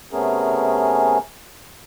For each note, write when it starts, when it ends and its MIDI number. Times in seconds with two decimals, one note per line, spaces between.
0.12 1.18 48
0.12 1.18 57
0.12 1.18 59
0.12 1.18 61
0.12 1.18 68
0.12 1.18 70